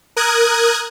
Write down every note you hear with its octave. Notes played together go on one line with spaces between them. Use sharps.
A#4 D#6 F#6 G#6